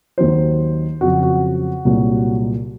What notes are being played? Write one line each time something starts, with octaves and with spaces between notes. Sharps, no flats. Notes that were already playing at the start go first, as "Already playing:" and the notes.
D#2 D#3 F#3 C5
F2 C#3 F#3 F#4
F#4
C2 A#2 F#3